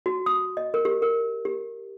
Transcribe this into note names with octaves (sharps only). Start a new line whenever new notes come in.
F#4
D#6
D#5
A#4
G4
A#4
G4